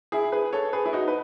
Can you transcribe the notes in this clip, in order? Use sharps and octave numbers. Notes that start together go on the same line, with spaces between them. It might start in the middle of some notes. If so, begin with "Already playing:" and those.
E4 G#4
G#4 B4
A4 C#5
G#4 B4
E4
D#4 F#4
B4